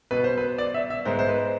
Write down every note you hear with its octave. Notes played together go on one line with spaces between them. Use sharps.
B2 B3 B4
C5
B4
D5
E5
E5
G#2 G#3 B3 C5
C5
B4